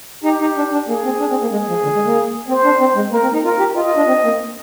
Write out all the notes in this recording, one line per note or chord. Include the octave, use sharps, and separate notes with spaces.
D#4 G4
D#4
D4
D4
A#3 G#4
C4
D4
C4
A#3
G#3 G#4
F3
D3
G#3
A#3
C4 C5
D4
C4
G#3
A#3 A#4
C4
D#4
F4 A#4
G4
F4 D#5
F4
D4
C4
A#3